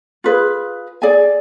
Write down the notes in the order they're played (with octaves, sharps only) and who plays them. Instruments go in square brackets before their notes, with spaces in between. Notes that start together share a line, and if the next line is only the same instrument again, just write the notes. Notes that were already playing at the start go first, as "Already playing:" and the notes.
[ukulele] F4 G#4 B4
G#4 D5 G#5